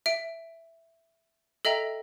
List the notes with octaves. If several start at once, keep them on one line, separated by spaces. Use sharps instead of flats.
E5 D7
A4 D#5 E5 G5 A#5